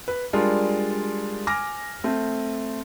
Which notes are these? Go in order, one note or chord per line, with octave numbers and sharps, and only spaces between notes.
B4
G3 G#3 D4 F4 A#4
G#5 D6 F6 A#6
A3 C4